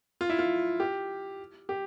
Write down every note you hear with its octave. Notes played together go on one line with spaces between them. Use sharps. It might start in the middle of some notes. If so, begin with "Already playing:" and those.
F4
E4
F4
G4
G4